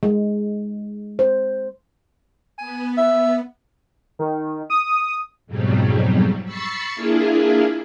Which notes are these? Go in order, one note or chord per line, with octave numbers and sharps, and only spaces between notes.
G#3
C5
B3 G#5
E5
D#3
D#6
F2 G#2 B2 F#3 G3
B5 C#6 E6 A6 C7 C#7
A#3 D4 E4 F4 G#4